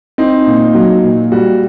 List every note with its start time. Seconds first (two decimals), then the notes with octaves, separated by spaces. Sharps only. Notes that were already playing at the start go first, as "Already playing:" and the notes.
0.18 C4 D#4
0.47 A#2
0.75 F#3
1.04 A#2
1.32 G3 F#4